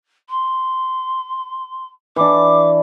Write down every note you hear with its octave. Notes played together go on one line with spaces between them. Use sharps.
C6
E3 D4 D6